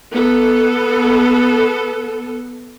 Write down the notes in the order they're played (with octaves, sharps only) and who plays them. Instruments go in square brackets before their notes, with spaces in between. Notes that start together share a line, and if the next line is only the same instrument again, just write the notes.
[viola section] B3 A4